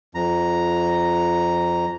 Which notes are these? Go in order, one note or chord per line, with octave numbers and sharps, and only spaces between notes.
F2 A#5